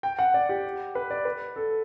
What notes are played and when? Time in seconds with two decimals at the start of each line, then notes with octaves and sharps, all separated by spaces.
0.03 G5
0.19 F#5
0.34 D5
0.49 G4
0.95 B4
1.11 D5
1.25 B4
1.56 A4